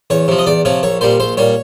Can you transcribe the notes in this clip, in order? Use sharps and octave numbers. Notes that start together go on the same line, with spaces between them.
E2 C#5
C3 F3
D#5
E2 D5
C3 F3 C#5
A#1 C#5
A#2 G3 C5
A#1 C5
A#2 G3 C#5